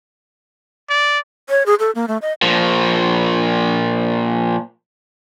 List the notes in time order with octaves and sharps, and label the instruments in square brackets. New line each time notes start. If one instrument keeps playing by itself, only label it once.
[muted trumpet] D5
[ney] C#5
G#4
A4
A#3
A3
D#5
[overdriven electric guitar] A#2 F3